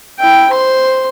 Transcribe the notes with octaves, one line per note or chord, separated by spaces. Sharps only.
E4 G5
C5 C6